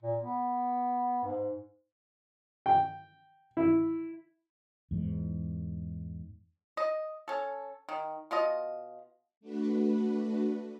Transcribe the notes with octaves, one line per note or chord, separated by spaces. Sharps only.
A#2
B3
G#2
G5
E4
E2 G#2
D#5
C#4 A4
D#3
B2 F4 D#5
A3 D4 F#4 B4